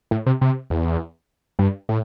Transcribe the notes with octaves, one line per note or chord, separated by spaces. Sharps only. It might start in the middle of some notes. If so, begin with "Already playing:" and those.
A2
C3
C3
E2
G2
A2